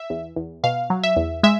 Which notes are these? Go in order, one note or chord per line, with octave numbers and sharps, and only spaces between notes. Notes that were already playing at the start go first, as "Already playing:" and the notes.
Already playing: E5
E2
E2
B2 F5
F#3
E5
E2
G#3 E5